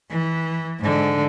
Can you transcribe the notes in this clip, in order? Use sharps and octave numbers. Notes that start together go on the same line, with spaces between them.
E3
G#2 D3